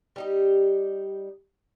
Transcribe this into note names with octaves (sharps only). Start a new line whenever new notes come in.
G3 D#4 G4